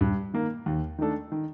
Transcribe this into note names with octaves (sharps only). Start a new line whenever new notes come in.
G2
D#3 A#3
D#2
D#3 A3 D4 A4
D#3